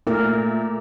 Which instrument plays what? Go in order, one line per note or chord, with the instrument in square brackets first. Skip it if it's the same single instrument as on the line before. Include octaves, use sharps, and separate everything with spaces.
[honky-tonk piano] A#2 [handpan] A3 A#4